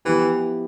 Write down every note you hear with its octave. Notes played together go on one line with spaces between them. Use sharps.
E3 F3 B3 E4 G4